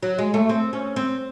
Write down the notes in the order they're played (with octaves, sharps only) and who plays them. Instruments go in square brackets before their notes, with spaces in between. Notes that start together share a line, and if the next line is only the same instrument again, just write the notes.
[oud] F#3
G#3
A3
C4
C#4
C4